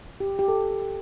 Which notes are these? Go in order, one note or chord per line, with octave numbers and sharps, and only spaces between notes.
G4
G4
A4